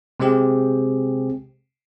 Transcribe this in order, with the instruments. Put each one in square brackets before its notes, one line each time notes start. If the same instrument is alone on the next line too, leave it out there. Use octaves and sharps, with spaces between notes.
[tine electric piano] C3 G#3 C4 G4 G#4